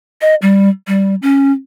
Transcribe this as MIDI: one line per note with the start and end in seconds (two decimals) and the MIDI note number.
0.21 0.35 75
0.42 0.69 55
0.87 1.15 55
1.22 1.52 61